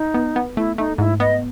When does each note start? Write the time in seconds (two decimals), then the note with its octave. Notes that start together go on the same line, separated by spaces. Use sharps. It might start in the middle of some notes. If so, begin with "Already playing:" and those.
Already playing: D#4
0.14 B3
0.36 B3
0.57 A3 E4
0.78 A3 D#4
0.98 G#2 E4
1.20 B3 D#5